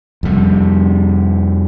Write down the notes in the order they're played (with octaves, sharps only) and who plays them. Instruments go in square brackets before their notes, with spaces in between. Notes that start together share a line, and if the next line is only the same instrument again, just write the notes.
[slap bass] F2 C3 G3